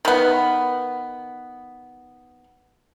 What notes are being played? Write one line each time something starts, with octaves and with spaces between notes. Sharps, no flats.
D#3 B3